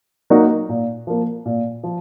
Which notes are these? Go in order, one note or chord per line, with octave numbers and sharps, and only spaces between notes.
F#3 A#3 D#4 F#4
A#2
F3 A#3
A#2
F3